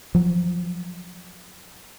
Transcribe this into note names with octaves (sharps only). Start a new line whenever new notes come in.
F3 F#3